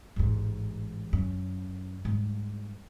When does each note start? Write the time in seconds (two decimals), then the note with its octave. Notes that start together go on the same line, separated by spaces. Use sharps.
0.16 A1 G#2
1.13 F#2
2.05 G#2 G3